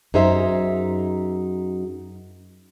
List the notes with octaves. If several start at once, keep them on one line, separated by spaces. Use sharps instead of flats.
F#2 D#4 G#4 C5 E5 A#5